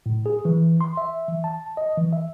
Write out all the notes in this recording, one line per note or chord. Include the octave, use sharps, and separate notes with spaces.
A2
G#4
E3
C6
E5
E3
A5
D#5
E3
E5